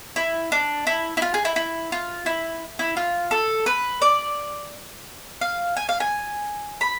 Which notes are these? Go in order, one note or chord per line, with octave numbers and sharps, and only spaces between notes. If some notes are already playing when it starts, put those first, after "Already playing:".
E4
D4
E4
E4
F4
G#4
E4
E4
F4
E4
E4
F4
A4
B4
D5
F5
G#5
F5
G#5
B5